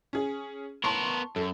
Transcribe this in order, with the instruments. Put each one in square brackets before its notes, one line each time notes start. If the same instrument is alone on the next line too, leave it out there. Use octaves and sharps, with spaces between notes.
[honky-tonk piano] C#4 G#4
[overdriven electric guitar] B3 A#4 [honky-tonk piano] A5 C6 C#6
[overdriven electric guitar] F#2 [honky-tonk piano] A4